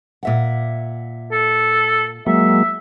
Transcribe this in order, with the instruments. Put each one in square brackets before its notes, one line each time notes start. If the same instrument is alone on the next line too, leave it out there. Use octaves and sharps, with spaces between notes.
[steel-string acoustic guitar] A#2 E5 F#5
[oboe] A4
[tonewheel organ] F#3 G#3 A#3 [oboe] E5